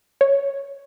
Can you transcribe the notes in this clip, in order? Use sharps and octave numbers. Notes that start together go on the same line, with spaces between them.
C#5